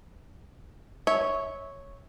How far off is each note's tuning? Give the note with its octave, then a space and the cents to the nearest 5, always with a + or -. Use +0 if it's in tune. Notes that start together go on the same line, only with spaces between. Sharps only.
C#5 +0 E5 -20